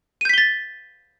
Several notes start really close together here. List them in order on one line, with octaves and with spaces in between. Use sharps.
D#7 G6 B6 G7 A6